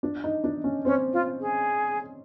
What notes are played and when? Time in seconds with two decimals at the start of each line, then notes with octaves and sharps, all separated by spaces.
0.03 D4
0.24 D#4
0.44 D4
0.64 C#4
0.85 C4 C#4
1.13 F4
1.40 G#4